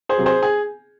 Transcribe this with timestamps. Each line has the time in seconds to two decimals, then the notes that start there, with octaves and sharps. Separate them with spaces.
0.09 G#4 C5
0.18 C3 F#3
0.26 G#4 C5
0.43 G#4